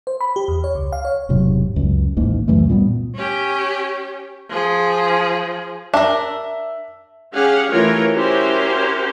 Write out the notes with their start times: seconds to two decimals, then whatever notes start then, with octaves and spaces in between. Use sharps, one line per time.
0.07 C5
0.21 B5
0.36 G4
0.48 E2
0.64 C#5
0.75 C#2
0.92 F5
1.05 C#5
1.29 E1 G#2 C3 F#3
1.76 C#2 F#2
2.17 A1 D#2 G#2 A#3
2.48 C#2 F#2 E3 A3
2.69 A#2 G3 B3
3.15 C#4 G4
4.49 F3 G#4
5.94 D4 A#4 E5
7.34 C#4 G4 G#4 F5 F#5
7.70 E3 A3 F4 G4 A#4 C#5
8.14 C#4 E4 F#4 G4 A#4 C5